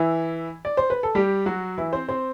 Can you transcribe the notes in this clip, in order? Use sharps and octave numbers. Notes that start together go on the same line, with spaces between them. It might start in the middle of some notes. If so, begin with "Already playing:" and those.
Already playing: E3 E4
D5
C5
B4
A4
G3 G4
F#3 F#4
E3 E4
C4 C5
C4 C5